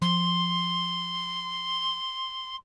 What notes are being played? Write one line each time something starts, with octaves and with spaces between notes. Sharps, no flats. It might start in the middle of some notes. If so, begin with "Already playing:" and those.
F3 C6